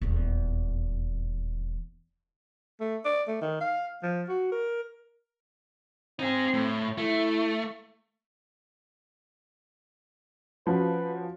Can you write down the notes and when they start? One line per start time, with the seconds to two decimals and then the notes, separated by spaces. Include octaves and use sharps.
0.01 D#1 E2
2.80 A3
3.05 D5
3.28 A3
3.42 D#3
3.61 F5
4.03 F3
4.29 F#4
4.52 A#4
6.19 C4 D#4 G#4
6.54 A2
6.98 A3 E4
10.67 F3 C#4 F#4 B4